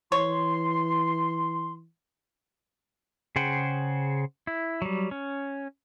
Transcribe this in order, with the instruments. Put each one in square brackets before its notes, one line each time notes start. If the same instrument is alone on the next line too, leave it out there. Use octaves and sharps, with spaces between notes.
[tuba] E3 [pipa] C#5 [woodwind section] C6
[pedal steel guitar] C#3 G#4 C5 F#5 G5
E4
F#3 G3
C#4